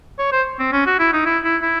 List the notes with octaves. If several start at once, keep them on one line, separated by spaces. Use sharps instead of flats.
C#5
C5
C4
C#4
F#4
E4
D#4
E4
E4
E4